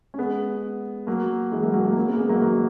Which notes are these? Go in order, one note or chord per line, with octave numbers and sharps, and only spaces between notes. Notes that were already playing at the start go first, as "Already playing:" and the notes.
C#4
G#3 B3
F#3 A#3
E3 G#3
F#3 A#3
F#3 A#3
F#3 A#3
A#3 C#4
G#3 B3
A#3
G#3 B3
F#3 A#3
D#3 F#3